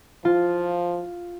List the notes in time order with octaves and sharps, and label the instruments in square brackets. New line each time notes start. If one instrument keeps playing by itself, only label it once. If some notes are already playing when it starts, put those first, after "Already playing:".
[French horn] F3 [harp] F4